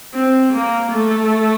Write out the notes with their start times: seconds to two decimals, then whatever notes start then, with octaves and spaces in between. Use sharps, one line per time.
0.14 C4
0.53 A#3
0.91 A3